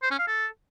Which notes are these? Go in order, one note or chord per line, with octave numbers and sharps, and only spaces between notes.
C5
C#4
F5
A4